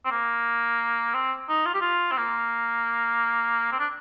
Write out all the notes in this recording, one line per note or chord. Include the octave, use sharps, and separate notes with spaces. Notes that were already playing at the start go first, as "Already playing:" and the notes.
C4
A#3
C4
D#4
F4
G4
F4
C4
A#3
C4
D4